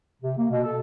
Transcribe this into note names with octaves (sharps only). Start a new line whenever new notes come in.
C3
A#3
B2
A4